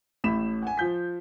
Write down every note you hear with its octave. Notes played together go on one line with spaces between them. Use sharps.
A1 A2 E4 B5 B6 E7
F#5 G#5
F3 F4 G6 B6